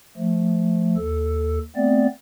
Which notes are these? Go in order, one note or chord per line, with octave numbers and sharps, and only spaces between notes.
F3 A3
D#2 A4
A3 B3 C4 D5